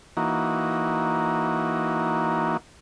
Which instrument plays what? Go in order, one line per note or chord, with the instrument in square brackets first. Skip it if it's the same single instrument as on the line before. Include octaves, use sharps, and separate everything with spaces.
[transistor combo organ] E3 A#3 D#4 F#4